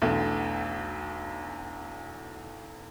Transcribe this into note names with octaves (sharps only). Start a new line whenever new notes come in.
B1 E2 D3 A3